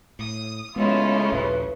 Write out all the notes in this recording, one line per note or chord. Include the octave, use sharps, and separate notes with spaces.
A2 D#6
C#3 G#3 A3 B3 C#4 E4 F4
A#1 D#2 G3 B4